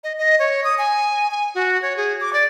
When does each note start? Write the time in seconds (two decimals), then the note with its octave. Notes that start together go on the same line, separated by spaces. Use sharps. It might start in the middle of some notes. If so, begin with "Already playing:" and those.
0.04 D#5
0.18 D#5
0.39 C#5
0.64 D#6
0.78 G#5
1.31 G#5
1.55 F#4
1.82 C#5
1.97 G#4
2.21 D6
2.33 D5